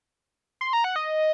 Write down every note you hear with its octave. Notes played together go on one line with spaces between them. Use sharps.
C6
A#5
F#5
D#5